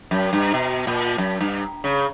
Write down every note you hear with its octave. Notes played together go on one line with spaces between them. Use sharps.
F#2
G2
B2
A#2
F#2
G2
C#3